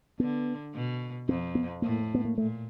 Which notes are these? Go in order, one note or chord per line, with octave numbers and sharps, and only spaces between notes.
D3 B3
B2
F2 C4
B3
A2 A#3
B3
A#3
A#2 A3